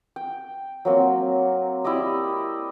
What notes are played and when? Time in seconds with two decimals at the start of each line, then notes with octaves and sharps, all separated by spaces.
0.16 G5
0.85 F#3 A#3 C4
1.84 E4 G4 D5 D#5